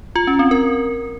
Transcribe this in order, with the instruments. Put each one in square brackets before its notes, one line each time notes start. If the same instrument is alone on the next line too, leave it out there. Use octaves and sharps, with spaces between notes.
[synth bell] F4
C#4
C4
A#4